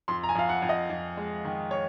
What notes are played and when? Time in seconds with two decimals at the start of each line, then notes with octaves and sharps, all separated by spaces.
0.08 F2 C6
0.23 A#5
0.29 G#5
0.35 F2 F5
0.49 F#5
0.62 F2
0.69 D#5
0.90 F2
1.17 G#3
1.45 D#3
1.71 C#5